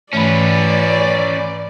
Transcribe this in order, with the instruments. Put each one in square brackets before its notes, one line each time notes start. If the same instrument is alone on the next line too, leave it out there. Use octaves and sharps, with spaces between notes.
[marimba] G#2 E3 A3 [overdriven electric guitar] C#4 B4 [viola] D5